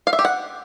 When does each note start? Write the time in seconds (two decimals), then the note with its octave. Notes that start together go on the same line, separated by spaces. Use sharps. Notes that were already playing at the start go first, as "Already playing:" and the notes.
0.07 F5
0.13 E5
0.19 G4
0.25 F#5